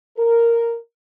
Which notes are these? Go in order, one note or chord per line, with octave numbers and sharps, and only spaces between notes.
A#4